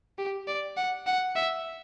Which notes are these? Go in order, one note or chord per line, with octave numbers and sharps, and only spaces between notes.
G4
D5
F#5
F#5
E5